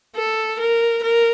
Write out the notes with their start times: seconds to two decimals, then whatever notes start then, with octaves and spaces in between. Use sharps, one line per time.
0.16 A4
0.59 A#4
1.03 A#4